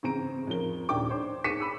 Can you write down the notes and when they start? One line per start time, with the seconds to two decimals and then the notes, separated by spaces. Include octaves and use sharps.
0.03 A1 C#3 C4 A#5 D7
0.47 F2 C#4 F4 A#4 G7
0.89 D#1 D4 G5 D6
1.09 D4 C5 C#5
1.44 D6 B6 C#7 D#7 E7
1.60 B5 E6